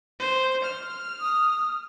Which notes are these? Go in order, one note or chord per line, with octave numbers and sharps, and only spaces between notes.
C5
F6
D#6